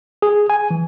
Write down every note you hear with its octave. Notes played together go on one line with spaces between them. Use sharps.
G#4
G#5
E3